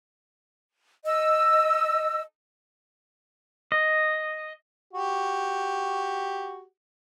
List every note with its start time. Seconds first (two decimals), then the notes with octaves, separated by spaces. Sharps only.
1.05 D#5 E6
3.72 D#5
4.93 F#4 G4